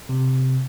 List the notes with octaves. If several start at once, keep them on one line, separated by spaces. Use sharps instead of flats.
C3